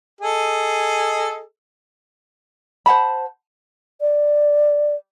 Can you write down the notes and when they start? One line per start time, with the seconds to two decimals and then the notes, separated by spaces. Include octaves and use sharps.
0.21 G#4 A4 D#5
2.86 C5 F#5 A5 B5
4.01 D5